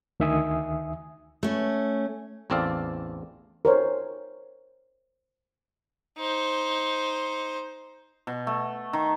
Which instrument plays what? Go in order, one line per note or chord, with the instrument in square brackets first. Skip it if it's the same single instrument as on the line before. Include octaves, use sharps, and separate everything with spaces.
[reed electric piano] D2 D#3 E5 G#5 D#6
[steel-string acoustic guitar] A3 C#4
[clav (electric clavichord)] A1 E2 C4 A4 D5 F5
[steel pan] A#4 C5 C#5
[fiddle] D#4 C5
[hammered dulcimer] B2
A3
D#3